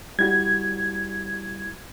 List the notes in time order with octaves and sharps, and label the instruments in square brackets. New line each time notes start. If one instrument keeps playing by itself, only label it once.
[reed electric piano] G3 E4 F#4 [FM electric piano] G#6